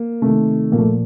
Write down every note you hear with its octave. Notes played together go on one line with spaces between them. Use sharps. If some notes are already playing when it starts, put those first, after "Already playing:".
Already playing: A#3
C3 D#3 A3
A#2 F3 A#3
A3